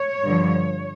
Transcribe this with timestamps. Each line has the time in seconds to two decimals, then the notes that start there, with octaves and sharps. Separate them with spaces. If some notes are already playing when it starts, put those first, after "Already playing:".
Already playing: C#5
0.24 G2 D3 F3